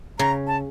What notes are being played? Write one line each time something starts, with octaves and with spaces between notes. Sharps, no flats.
C#3 A#5
A5